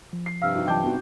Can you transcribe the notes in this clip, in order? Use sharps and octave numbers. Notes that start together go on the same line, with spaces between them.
F3
C7
G2 C3 F5 E6 F6
D#4 F#4 G4
E3 F#3 F4 D#5 G5 A5 D6 G6
B3 C4 D#4 F#4